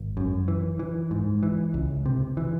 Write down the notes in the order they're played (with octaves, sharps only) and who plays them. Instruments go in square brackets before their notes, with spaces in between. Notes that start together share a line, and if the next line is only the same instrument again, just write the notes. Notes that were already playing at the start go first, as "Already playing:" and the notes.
Already playing: [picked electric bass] G#1
F#2
E3
E3
G#2
E3
C#2
C3
E3